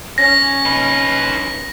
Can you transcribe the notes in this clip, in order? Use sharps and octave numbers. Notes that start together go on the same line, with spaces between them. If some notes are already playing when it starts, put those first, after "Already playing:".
C#4 A#6
D#4 B4